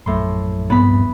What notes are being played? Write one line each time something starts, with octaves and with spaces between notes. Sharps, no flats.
A#1 F#2 A2 C6
G2 F3 B3 C4 B5
D#1 D4